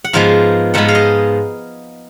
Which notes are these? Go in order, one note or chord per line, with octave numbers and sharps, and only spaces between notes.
F#5
G#2 F3 G#3 B3 F5
G#2 F3 G#3 B3 F#5
F5
D#5